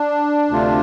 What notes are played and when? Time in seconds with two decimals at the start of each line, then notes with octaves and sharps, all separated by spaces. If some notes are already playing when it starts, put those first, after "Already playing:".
Already playing: D4
0.50 D2 C3 A3 F4